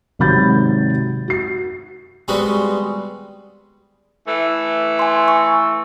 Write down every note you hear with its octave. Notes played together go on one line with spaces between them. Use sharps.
G#1 C3 F#3 B5 G6 A6
F#4 C7
G3 G#3 B3 C4 F#4
E3 A3
G#5 C6
C#6